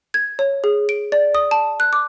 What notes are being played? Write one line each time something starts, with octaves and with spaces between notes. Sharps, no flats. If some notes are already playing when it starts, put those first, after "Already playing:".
G#6
C#5
G#4
D7
D5
D#6
A5
F#6
D6